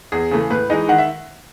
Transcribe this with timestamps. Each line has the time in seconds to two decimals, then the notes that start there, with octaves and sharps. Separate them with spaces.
0.12 E2 G#4
0.31 C#3 E3 A3
0.50 A2 B4
0.70 E3 G#3 D#4 D#5
0.88 D#3 F#5
0.98 E5